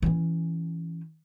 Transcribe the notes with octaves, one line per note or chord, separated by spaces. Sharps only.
E3 C#4